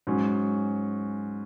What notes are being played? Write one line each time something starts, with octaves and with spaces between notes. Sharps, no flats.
G#2 F#3 C#4